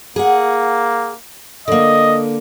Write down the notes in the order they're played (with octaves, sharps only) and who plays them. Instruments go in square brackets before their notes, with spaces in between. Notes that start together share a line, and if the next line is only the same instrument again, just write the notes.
[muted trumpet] A#3 [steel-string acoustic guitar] G#4 F#5
[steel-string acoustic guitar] D3 A#3 [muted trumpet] D#5